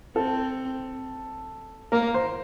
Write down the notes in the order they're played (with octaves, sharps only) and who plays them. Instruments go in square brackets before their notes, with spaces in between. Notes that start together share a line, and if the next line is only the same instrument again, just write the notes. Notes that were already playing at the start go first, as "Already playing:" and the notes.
[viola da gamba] C4 [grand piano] A4
[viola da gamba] A#3 [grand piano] A#4
[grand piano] C5